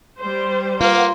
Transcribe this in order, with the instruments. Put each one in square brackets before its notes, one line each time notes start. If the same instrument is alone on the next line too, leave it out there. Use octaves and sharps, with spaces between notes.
[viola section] G3 C5
[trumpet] A#3 [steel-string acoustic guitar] F4 [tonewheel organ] B4 F5 F#5